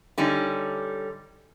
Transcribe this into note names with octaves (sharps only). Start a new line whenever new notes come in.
D3 G3 C#4 D#4